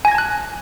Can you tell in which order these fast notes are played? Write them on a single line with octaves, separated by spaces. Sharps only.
G#5 A#6 G#6 A5 F#6